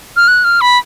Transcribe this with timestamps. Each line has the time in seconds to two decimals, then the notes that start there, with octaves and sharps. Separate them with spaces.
0.17 F6
0.28 F#6
0.44 F6
0.61 B5